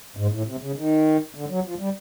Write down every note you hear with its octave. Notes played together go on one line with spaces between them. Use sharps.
G#2
A2
C3
C#3
D#3
D3
F#3
F3
G3